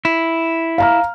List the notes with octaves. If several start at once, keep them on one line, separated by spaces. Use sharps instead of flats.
E4
F5 A#5 F6